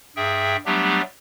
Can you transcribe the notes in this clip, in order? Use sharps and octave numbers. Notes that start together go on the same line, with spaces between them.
G2 G#4 E5 G5
F#3 G3 A3 B3 D4 G4